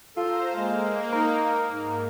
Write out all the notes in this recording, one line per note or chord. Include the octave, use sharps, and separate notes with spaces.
F4 A4 C5 A#5
G#3 A#3 F5
D#4 A#4
G#2